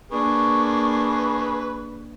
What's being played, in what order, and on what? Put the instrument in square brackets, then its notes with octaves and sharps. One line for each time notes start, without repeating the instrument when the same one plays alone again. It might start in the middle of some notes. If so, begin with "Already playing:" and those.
[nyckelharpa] A#3 D4 [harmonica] G#4 B4 [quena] C#6